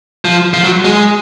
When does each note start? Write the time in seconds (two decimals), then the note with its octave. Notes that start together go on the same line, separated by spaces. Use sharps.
0.25 F3
0.53 F3
0.64 F#3
0.85 G#3